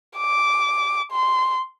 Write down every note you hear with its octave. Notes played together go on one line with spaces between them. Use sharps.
D6
C6